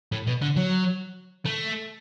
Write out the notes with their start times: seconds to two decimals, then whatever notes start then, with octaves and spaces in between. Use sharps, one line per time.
0.12 A2
0.27 B2
0.42 D3
0.56 F#3
1.45 A3